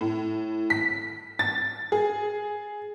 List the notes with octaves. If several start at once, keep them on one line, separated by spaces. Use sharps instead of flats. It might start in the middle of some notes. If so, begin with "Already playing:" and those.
A2
B6
A6
G#4